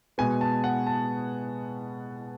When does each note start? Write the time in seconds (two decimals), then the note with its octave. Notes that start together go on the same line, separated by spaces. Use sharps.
0.18 B2 G#3 B3 G#5
0.41 A5
0.64 F#5
0.87 A5